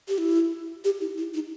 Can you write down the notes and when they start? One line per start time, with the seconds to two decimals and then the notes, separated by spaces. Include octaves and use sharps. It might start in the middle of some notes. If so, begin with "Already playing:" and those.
0.08 G4
0.18 E4
0.85 G4
1.01 E4
1.18 E4
1.34 D#4